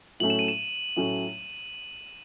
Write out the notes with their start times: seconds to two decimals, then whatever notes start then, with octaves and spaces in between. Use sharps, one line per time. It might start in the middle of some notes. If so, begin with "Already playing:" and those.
0.20 A2 F#3 A3 C#4 F#7
0.30 E7
0.39 D#7
0.48 E7
0.96 A2 F#3 A3 C#4